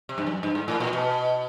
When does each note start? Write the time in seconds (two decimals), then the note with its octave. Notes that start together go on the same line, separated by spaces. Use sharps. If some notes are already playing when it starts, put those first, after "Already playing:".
0.09 C3
0.18 G2
0.27 F#2
0.43 G2
0.55 G#2
0.68 A2
0.80 A#2
0.93 B2